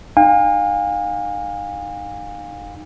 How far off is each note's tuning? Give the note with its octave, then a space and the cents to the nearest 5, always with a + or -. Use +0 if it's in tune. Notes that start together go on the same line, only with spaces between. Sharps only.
D#4 -20 F5 +30 G#5 -40